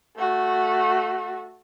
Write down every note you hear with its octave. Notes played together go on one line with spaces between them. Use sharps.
A3 F#4